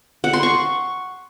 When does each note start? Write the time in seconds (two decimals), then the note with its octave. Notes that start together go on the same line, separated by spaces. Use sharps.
0.24 F#5
0.33 C6
0.43 C#6